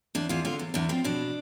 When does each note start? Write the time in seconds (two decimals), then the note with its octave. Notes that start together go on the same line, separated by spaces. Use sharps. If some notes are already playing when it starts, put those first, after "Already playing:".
0.15 E2 D4
0.29 E2 F4
0.45 D3 F4
0.59 E2
0.74 E2 D4
0.89 F3 C4
1.04 B2 D4